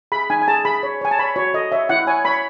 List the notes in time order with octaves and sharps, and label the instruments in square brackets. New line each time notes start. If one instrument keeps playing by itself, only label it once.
[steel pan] G#4 B5
D#4 G#5
G#5
G#4 A5
G#4 B5
C#5
C#5 G#5
A5
C#5 B5
F#4 C#5
A4 D#5
C#5 E5
E4 F#5
C#5 G#5
C#5 B5